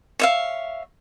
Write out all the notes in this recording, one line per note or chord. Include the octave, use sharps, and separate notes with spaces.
C#5 E5 F5